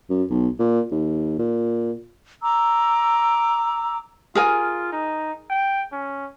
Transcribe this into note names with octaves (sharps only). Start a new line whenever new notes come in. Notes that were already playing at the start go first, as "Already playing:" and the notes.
F#2
B1
A#2
D#2
A#2
A#5 D6 E6
F4 G#4 A#4 G#5
D#4
G5
C#4